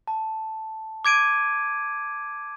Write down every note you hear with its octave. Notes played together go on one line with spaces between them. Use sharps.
A5
D6 G#6 D7 D#7